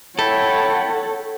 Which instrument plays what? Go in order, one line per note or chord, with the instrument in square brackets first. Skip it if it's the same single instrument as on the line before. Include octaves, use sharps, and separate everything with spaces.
[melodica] E4 G5 B5 [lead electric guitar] A4 [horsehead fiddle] C#5 F#5